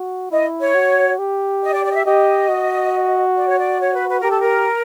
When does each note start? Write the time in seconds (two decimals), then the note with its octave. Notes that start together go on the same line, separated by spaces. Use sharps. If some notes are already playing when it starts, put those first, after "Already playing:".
Already playing: F#4
0.31 E4 D#5
0.60 C#5
0.74 F#4
1.19 G4
1.63 D#5
1.73 D5
1.84 D5
1.91 D#5
1.95 E5
2.05 G4 D#5
2.49 F#4
3.36 D5
3.47 C#5
3.59 D5
3.80 C#5
3.94 B4
4.09 B4
4.19 G4 A#4
4.31 A4
4.41 A#4